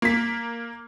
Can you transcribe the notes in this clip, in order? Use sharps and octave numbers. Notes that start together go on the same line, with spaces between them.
A#3 B6